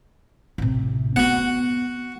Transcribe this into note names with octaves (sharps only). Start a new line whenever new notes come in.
A1 C3
B3 F#4 F#5